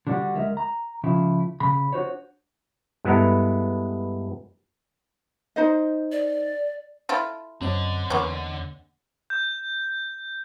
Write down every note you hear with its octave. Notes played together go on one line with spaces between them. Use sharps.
D3 G3 D4 E4 F#4
D2 G#3 A#4 E5
A#5
C#2 C#3 F3 E4
C#3 B5
D4 F#4 C5 C#5
G2 G#3 B3 E4 A4 A#5
D#4 C5 D#5
D5
E4 F4 A4
F#2 D3 C4 C#5 D#5
E2 A#3 B3 C#4
G6